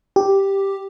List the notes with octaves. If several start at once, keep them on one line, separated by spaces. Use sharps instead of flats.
G4